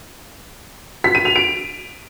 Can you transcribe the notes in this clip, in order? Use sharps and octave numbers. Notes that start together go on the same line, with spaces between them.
B6
D#7
F7
D7